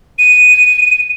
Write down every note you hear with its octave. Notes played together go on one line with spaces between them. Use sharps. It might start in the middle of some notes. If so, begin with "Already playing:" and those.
D#7